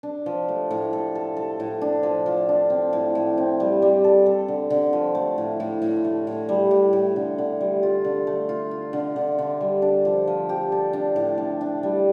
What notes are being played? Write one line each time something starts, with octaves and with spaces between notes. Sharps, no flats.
D4
F3
A3
A2
A4
A4
A4
A2
D4
F3
F3
D4
C4
A2
A2
C4
G3
G3
A4
A4
D3
D3
F3
A3
A2
A2
A2
A3
A2
G3
A2
A2
D3
D3
G3
F4
D3
A3
F4
F4
D3
D3
D3
G3
D4
F3
F3
G4
A4
D4
A2
D4
D4
G3